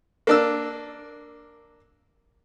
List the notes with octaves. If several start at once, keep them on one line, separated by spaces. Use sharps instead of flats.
A#3 D4 E6